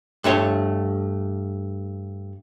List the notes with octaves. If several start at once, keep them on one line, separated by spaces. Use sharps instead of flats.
G2 A3 C#5 C6